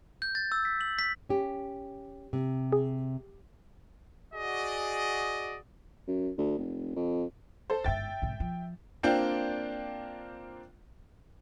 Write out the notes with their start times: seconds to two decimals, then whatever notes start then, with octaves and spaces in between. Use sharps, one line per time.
0.22 G6
0.35 A6
0.52 E6
0.65 B6
0.81 F#7
0.99 B6
1.29 C#4 G4
2.33 C3
2.73 G#4
4.34 F#4 G#4 D5 D#5
6.08 F#2
6.38 D2
6.58 F1
6.96 F2
7.70 A4 C5
7.84 G1 G#2 E5 G5 A6
8.22 G#2 C3
8.40 F3
9.03 A#3 C4 D4 F4 D5 G5